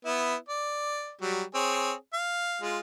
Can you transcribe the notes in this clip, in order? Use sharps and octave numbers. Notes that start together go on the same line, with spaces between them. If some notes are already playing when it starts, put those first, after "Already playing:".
B3 E4
D5
F#3 G3
C4 G#4 C#5
F5
G#3 F4